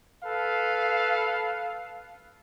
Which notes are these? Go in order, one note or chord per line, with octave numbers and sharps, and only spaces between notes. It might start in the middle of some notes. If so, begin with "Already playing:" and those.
A4 B4 F5